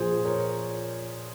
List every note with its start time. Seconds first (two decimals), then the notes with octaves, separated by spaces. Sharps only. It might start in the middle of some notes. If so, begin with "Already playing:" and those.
Already playing: A#2 F3 G#4 C5
0.25 A#4 C#5